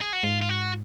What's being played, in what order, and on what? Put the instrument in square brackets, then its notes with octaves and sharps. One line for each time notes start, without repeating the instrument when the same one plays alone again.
[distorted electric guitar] G#4
F#4
[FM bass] G#2 [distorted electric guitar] F4
[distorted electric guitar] F4
F#4